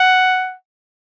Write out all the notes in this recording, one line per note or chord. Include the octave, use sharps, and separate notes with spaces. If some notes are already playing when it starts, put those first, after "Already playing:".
Already playing: F#5